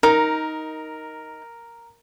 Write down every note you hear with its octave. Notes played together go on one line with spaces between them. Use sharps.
D#4 A#4